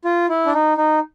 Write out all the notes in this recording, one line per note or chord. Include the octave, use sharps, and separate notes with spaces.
F4
E4
D4
D#4
D#4